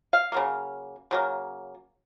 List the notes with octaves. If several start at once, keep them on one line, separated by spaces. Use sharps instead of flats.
F5
C#3 F#3 A#3
C#3 F#3 A#3